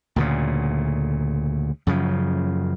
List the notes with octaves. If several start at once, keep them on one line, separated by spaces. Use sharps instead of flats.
D2 A#2 C#3
F#2 C#3 F3